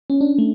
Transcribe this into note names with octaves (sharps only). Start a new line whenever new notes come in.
C#4
D4
A3